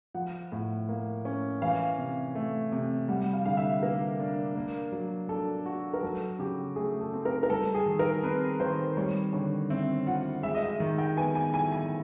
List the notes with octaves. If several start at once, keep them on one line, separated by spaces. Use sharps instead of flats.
F3 F#5
A2
A#3
C#4
E3 F5
C3
A3
C3
G3 F#5
F#5
F5
D3 F5
E5
A#3 A#4
D4
A#3
F#3
D4 A4
F#4
A#4
F#3 A4
C#3 G4
A3 G#4
A4
C4
A#4
A#4
G3 A4
G#4
D#3
A#4
C4 B4
D#3 C5
G3 C#5
D3 C#5
C4 E5
F4 F#5
G#3 E5
D#5
E5
D#3
G5
B3 G#5
G#5
E4 G#5
G#5